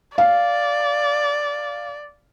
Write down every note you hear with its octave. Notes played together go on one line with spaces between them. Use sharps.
D5 F5